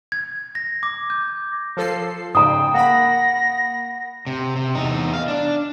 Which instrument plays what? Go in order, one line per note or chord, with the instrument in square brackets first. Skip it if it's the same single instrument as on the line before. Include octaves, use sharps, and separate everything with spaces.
[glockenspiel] G#6
A#6
D6
G6
[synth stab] F3 A4 C7
[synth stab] G#2 C#3 [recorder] G5 [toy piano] A#5 D#6
[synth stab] A#3 B5 [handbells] F#5 [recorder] A#6
[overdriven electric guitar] C3
C3
E2 D#4
F5
D4